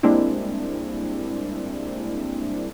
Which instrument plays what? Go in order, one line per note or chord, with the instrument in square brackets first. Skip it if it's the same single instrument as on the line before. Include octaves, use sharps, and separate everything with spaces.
[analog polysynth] G3 G#3 A#3 C4 D4 E4